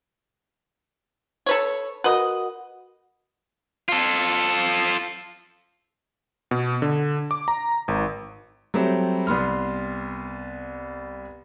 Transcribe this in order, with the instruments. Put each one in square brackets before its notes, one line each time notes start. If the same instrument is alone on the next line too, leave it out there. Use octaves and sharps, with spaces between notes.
[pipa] A4 B4 C#5
[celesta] F#4 A#4 F#5 [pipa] B4 D#5
[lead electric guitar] F4 A4
[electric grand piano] B2
D3
D6
A#5
G#1
[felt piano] F#3 G3 A3 C4 G4
C2 B3 C6 F6